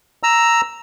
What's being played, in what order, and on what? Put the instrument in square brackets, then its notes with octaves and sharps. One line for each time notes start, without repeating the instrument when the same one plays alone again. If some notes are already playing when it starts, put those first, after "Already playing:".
[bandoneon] A#5 E6